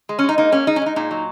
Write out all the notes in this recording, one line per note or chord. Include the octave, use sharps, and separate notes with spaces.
G#3
C#4
G#3 D#4
A#3 D#4
A#3 C#4
G#3 D#4
C#4
G#3 D#4
A#2 D#4
F#3